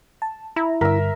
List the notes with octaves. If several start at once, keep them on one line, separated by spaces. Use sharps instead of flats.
A5
E4 A#5
G2 D3 A#4 E5 B6